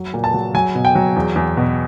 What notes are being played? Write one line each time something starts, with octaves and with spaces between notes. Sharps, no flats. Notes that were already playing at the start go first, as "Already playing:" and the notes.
Already playing: F#3
A#2
A5
F#3
F#3 G#5
B2
G5
F#3
E2
E2
B2